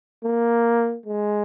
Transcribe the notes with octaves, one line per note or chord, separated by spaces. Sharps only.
A#3
G#3